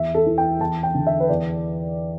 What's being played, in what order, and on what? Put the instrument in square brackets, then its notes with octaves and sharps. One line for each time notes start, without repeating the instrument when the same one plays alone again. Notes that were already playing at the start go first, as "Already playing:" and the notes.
Already playing: [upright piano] E2 E5
A4
E3
G5
E2 A5
G5
D3
E5
B4
E2 D5